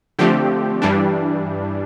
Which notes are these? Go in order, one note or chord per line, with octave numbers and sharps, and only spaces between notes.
D3 F3 A3 C4 G4
G2 E3 G3 D4